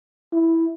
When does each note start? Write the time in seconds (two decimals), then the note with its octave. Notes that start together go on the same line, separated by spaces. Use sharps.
0.33 E4